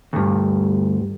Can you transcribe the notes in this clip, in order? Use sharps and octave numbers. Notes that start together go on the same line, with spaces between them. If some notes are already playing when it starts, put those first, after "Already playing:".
D2 G2